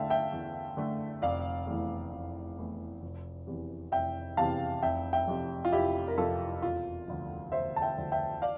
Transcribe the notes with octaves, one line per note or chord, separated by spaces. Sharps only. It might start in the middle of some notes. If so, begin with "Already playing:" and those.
Already playing: E2 D3 A3 E5 F5 G5 A5
E5 G5
E2
D3 A3
F1 D5 F5
E2 E3 A3
F1
E2 E3 A3
F1
E2 C3 E3
F1 E5 G5
E2 C3 E3 F5 A5
F1 E5 G5
E5 G5
F2 C3
F4
F1 E4 G4
A#4
F2 C3 F4 A4
E1 F4
D2 D3 F3
E1 C5 E5
A5
E5 G5
D2 D3 F3
E5 G5
D5 F5